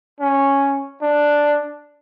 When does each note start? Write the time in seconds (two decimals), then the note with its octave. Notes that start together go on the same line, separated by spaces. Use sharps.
0.21 C#4
1.02 D4